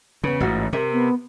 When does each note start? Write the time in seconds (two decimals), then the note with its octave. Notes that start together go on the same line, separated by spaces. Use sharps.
0.24 E2 C#3 B3
0.40 A1 G#2 F4 F#4
0.73 C3 A#4 E5
0.92 B3